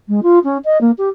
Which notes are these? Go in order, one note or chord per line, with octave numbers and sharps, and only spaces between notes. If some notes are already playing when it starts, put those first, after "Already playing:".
G#3
F4
C#4
D#5
A#3
G4